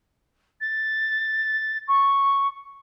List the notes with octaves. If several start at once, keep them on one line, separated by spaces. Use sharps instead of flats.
A6
C#6